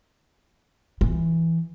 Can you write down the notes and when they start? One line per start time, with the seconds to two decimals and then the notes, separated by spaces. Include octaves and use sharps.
1.01 E3